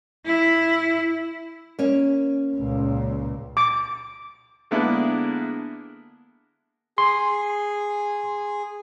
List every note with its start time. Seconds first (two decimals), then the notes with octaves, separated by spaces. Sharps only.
0.26 E4
1.79 A#3 C#4
2.56 C#2 A#2
3.57 D6
4.71 D3 G#3 A#3 B3 D4 E4
6.98 G#4 C6